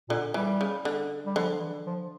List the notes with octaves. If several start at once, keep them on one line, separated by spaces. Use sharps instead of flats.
A#2 D3
E3 G3
C#3
D3
G3
D3 F3
E3
F3